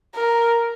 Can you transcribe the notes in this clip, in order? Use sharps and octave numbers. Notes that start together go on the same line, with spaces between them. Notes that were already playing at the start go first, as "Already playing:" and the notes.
A#4